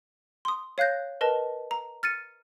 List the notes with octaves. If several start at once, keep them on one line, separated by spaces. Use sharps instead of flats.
C6 D#6
C#5 F5 F#6 G6 A#6
A#4 B4 D#5 A5
A#5
F6 A6 C#7 D#7